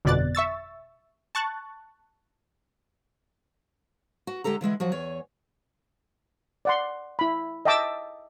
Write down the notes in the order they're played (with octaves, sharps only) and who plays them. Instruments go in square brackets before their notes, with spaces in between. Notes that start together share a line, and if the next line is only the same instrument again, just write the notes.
[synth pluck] G1 F2 B2 D5 F#6 A6
E5 C#6 E6 A6
A5 C#6 F#6 A6
[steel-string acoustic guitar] F#4
D3 G#3 G4 A4 A#5
D3 E3 G#3 E4
F3 F#3 F#4
E2 C#5 G#5
[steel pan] D5 F#5 C6
E4 B5
D#5 E5 G5 A5 D6 E6